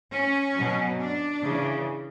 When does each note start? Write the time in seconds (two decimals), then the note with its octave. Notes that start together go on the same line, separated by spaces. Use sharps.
0.12 C#4
0.55 B2 F#3
0.99 D4
1.43 C#3 E3